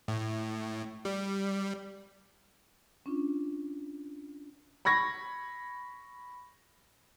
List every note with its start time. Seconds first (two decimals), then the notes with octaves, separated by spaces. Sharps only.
0.08 A2
1.05 G3
3.06 C#4 D4 F4
4.85 B5 C#6 G#6 A#6